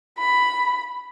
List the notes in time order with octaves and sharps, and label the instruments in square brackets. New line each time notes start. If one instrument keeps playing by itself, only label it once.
[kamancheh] B5